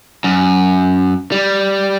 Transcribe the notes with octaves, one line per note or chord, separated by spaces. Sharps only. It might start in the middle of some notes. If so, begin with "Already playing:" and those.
F#2
G3